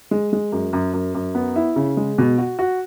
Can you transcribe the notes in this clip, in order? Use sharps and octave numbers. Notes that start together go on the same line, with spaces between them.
G#3
G#3
F#2
F#2
F#2
F#2
B3
E4
C#3
G#3
B2
F#4
F#4